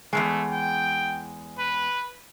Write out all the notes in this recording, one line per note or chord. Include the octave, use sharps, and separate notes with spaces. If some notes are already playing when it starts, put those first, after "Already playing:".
E2 C#3 G#3 A3
G5
B4